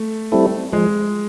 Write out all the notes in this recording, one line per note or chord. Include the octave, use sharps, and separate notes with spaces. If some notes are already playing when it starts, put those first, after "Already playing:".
Already playing: A3
G3 C4 E4 A4
F3 G#3